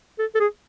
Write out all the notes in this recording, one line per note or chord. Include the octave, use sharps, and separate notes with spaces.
A4
A4
G#4